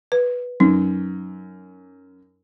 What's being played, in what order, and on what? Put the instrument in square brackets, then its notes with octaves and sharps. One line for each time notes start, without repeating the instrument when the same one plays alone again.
[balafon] B4
[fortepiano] F#2 [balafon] D#4